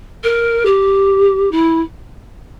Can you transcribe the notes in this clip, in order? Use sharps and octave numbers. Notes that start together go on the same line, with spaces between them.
A#4
G4
E4